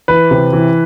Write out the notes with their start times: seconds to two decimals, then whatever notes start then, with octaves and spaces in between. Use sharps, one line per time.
0.08 E3 B4
0.31 C3
0.53 E3